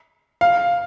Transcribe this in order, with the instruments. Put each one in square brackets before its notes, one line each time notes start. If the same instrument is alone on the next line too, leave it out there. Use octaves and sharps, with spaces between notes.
[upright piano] F5